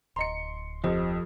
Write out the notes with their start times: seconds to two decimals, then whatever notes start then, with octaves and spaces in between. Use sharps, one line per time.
0.16 D1 D#5 A#5 C6 C#7
0.84 F2 F3 G4 C5 D#5